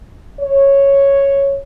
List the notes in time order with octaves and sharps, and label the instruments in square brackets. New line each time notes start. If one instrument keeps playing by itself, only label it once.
[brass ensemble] C#5